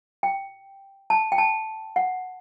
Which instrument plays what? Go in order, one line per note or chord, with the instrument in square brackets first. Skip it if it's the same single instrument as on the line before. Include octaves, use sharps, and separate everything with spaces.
[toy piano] G5
A5
G5
A5
F#5